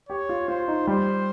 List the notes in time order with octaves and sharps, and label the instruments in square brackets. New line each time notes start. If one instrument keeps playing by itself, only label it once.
[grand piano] G4 [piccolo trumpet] C#5
[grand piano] F4
[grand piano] F4 [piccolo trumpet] C5
[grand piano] D#4
[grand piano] G3 [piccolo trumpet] C5